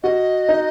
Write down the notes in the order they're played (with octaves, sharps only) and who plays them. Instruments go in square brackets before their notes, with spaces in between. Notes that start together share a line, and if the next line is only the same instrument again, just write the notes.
[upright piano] F#4 [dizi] D#5
[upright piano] D#4